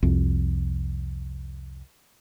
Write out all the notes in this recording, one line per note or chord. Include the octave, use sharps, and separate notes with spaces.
C2 F2